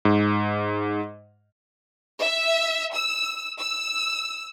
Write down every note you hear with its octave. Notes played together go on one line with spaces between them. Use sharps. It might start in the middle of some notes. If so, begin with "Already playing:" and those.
G#2
E5
E6
E6